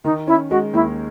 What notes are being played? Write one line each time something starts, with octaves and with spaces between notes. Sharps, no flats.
D#3 D#4
C#4 E4
G#3 F#4
D#2 E4